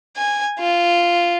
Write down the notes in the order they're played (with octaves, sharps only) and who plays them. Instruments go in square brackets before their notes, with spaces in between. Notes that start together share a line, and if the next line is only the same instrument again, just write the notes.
[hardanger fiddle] G#5
F4